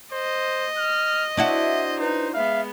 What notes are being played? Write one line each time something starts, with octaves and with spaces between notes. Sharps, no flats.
C5 D#5
F6
D4 E4 F#4 C5 E5
D#4 B4
G#3 B3 E5 F5